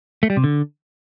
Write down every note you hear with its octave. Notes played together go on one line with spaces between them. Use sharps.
A3
G3
C3
D3